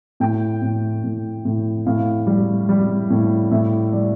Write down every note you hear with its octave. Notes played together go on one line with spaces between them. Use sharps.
A2 G5
A2
A2
A2
A2 F5
G3
G3
A2
A2 E5
G3 D5